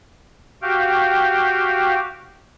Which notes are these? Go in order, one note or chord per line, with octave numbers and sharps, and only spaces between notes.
F#4 G4 F5 G5